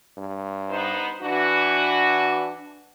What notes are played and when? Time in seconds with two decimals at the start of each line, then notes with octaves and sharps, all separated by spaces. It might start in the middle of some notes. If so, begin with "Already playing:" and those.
0.17 G2
0.70 B3 D#4 C5
1.22 E3 D4 F#4